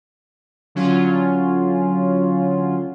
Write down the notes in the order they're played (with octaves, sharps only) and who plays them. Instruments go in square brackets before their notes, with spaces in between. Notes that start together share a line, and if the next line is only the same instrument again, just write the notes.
[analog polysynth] D3 F#3 C#4 F4